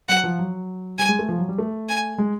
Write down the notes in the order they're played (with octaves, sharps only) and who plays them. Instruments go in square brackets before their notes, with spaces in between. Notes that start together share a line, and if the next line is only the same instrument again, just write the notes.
[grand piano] F#3 [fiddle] F#5
[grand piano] F3
F#3
[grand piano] G3 [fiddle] G#5
[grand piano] G#3
A3
F3
F#3
G3
A3
[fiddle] G#5
[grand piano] G#3